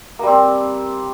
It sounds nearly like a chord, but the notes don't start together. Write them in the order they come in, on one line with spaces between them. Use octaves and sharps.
A#3 G3 C4